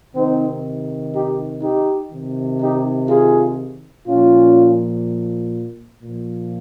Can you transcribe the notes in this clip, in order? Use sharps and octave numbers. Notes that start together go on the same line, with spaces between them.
C3 D#3 C4 D#4
D#4 G4
D#4 G4
C3 D#3
D#4 G4
F4 G#4
A#2 F3 C#4 F4
A#2 F3